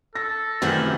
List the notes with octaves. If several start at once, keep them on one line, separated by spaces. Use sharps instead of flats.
A4 A#6
F#2 C3 D#3 E3 A3 G4 F#5